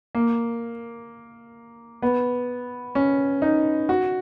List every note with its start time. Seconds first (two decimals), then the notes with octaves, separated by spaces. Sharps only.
0.15 A#3
2.02 B3
2.95 C#4
3.42 D#4
3.89 F#4